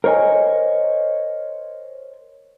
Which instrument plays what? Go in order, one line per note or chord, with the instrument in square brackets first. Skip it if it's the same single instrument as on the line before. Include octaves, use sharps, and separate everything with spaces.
[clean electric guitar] A#4 C5 C#5 D#5 G#5